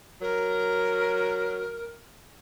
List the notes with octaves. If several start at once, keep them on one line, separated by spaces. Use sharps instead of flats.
F#3 A#4